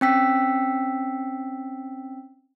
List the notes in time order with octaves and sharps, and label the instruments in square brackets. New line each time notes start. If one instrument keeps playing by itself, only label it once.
[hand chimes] C4 C#4 G5 E6 B6